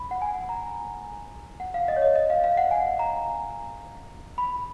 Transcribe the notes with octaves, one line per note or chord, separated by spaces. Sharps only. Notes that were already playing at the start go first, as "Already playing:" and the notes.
Already playing: B5
F#5
G#5
A#5
F#5
F5
D#5
C#5
D#5
D#5
F5
F5
F#5
G#5
A#5
B5